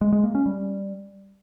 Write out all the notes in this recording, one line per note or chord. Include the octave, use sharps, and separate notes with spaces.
G#3
G#3
A#3
C#4
G3